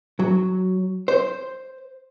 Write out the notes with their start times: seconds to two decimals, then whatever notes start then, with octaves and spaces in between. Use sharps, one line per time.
0.19 F#3
1.08 C5